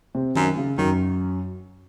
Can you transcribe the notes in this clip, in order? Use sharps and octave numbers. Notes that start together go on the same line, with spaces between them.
C3 C4
F#2 D#3
C#3
F#2 D#3 F#3